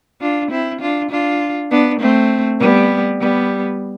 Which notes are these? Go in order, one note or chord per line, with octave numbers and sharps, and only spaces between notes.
D4 F4
C4 E4
D4 F4
D4 F4
B3 D4
A3 C4
G3 B3
G3 B3